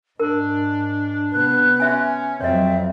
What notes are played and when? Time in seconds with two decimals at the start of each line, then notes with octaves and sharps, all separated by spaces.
0.19 G#2 D4 A#4
1.33 C3 B3 F#6
1.80 C#4 F#4 E5 G#5
2.41 F2 F#3 C4 C#5 D#5 E5